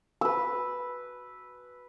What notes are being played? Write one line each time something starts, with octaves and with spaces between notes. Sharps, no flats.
B4 E6